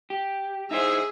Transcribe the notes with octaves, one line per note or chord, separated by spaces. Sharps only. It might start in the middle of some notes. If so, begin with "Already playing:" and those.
G4
D#4 E4 G#4 C5 E5